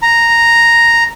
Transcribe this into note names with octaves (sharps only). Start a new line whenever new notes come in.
A#5